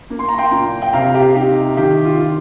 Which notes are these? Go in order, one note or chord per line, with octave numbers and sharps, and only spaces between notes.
A#3
C6
A#5
G5 C6
A#2
G5
C3 F5 A#5
G4
D#4 G4
D#3 G4
F4
F4